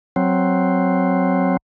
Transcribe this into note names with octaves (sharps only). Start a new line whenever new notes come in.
F#3 C4